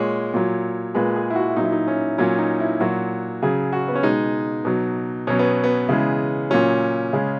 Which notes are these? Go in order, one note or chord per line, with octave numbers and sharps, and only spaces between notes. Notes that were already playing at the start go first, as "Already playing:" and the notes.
Already playing: A#2 G#3 C#5
A#2 F#3
A#2 G#3 B4
G#4
E4
F#4
A#2 F#3 D#4
E4
D#4
C#4
A#2 F#3 C#4
D#4
E4
A#2 F#3 F#4
C#3 F#3 G#4
F#4
B3
C#4
B2 G#3 D#4
B2 F#3
B2 F#3 C#4
B3
B3
C#3 E3 G#3
A#2 F#3 C#4
C#3 G#3